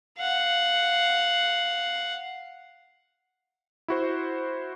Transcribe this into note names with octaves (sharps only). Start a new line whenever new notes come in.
F5 F#5
E4 F#4 C5